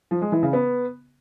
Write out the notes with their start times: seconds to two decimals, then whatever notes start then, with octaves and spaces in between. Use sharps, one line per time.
0.11 F3
0.22 G#3
0.32 E3
0.43 C#3
0.53 B3